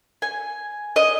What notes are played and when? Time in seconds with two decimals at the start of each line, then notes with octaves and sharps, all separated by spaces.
0.22 G#5
0.96 D#5